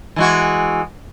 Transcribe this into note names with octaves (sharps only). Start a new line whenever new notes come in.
E3 G#3 F#4